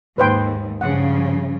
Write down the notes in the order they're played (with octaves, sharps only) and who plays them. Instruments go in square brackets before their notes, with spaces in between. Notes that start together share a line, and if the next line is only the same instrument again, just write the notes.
[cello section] D#2 G#2 [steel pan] B4 C5 G5
[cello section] G2 C#3 F3 [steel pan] F#5